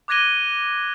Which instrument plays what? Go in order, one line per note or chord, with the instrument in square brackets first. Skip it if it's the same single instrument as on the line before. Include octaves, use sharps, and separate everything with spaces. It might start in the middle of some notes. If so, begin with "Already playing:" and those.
[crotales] D6 F#6 G#6 A#6 D#7 G7